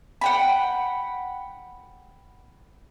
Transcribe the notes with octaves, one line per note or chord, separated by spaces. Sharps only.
F#5 G5 B5